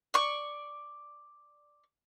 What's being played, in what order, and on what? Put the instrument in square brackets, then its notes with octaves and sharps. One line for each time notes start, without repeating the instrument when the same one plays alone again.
[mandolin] D5 C#6